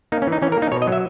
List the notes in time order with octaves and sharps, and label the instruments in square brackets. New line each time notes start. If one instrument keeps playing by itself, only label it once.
[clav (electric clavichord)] A#3 D#4
C#4
E3 D#4
E3 C#4
A#4
A#3
D#4
B2 C#5
D#5
F#3
E5